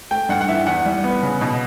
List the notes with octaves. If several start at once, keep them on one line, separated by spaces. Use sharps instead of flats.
A3 G5
G2 F#5
F#5
E3 E5
E2 F#5
G3
B3
C#3
B2